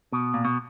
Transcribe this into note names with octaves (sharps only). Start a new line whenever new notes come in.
B2
A#2
B2